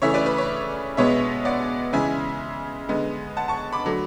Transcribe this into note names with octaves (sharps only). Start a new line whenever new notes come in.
C#3 E3 A3 C#5 E5
B4 D5
B4
C#5
B2 G#3 B3 C#5 E5
D5 F#5
C#3 E3 G#3 E5 G#5
D3 G#3 B3
F#5 A5
A5 C#6
B5 D6
D3 F#3 A3